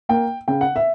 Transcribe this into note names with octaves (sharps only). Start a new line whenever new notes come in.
A#3 G5
C#3 G5
F#5
E5